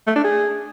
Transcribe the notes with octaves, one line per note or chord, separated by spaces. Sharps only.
A3
D4
G#4